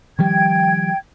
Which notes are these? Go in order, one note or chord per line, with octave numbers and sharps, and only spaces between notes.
D#3 F3 G3 G5 G#6